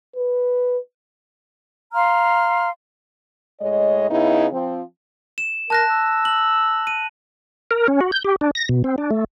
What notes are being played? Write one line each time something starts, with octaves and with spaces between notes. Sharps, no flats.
B4
F5 A#5 C6 F6
A2 G#3 C#5 D#5
C#3 B3 D#4 E4
F3 C4
E7
A#4 A5 F#6 A#6
E6
F#7
D#7
A#4
C#4
F#4
G6
G4
D4
A#6
B2
C4
D4
A3